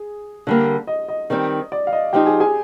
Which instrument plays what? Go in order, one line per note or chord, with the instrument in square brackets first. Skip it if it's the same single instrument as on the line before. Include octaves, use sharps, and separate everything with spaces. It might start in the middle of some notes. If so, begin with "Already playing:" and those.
Already playing: [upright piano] G#4
[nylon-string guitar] D3 G3 A#3
[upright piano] D#5
D#5
[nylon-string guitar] D#3 G3 C4
[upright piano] D5
F5
D#5
[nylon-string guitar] F3 C4 D#4 [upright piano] G4 G5
[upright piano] G#4 G#5
G#4 G#5